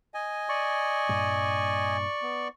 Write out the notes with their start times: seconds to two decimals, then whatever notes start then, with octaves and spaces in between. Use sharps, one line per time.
0.14 D#5 G#5
0.49 D5 C#6
1.09 G2 A#2 G3
2.22 B3